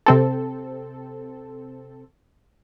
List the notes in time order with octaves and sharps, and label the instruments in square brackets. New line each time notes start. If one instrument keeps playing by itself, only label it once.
[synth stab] C3 C4 A4